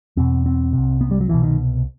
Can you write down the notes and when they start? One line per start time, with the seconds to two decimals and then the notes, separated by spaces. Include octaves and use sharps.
0.17 E2 B2 C4
0.46 C4
0.73 C2 C3
1.01 B3
1.11 G3
1.21 F#3
1.29 C2 B2 E3
1.43 D#3